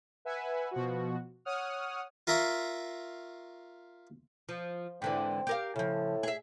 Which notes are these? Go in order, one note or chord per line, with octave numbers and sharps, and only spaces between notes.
B4 E5 F#5 G#5
B2 F3 F#4
C#5 F#5 D#6 F6
F4 A#4 E5 A#5 C6 C#6
F3
G#2 D3 E3 C4
G4 A#4 F5
A2 C#3 F3
G#4 E5